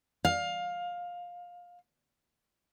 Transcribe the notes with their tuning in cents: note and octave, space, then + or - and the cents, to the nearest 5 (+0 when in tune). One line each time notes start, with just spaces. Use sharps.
F5 +15